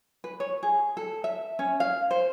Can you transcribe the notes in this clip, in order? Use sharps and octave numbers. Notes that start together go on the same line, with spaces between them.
B4
C#5
G#4
A4
E5
C#4
F5
C5